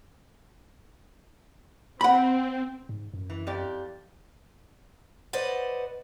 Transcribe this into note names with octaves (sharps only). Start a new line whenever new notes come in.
C4 F#5 B5
G#2
F#2
E3
F2 G4 D5
B4 C5 D5 D#5 F#5